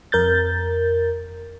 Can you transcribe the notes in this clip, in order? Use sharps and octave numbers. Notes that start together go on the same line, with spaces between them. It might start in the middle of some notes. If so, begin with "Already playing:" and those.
F2 A#4 G6 A6